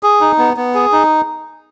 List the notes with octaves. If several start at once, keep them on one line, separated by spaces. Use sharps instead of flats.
G#4
D#4
B3
B3
G#4
D#4